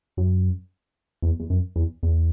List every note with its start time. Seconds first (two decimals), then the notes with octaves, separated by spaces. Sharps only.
0.17 F#2
1.22 E2
1.40 E2
1.50 F#2
1.76 E2
2.03 E2